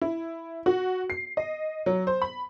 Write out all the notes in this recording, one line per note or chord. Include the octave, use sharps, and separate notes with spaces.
E4
F#4
C7
D#5
F#3
C5
B5